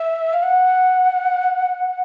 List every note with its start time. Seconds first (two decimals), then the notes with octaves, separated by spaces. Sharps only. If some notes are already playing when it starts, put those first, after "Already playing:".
Already playing: E5
0.33 F5
0.43 F#5